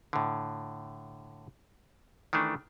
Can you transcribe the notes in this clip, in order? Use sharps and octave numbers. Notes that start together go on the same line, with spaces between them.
A2 D3
D#3 E3 A3 D4